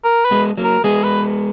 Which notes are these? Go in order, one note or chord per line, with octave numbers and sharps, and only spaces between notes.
A#4
B4
G#3 B3
F#3 A#3
A#4
G#3 B3 G#4
B4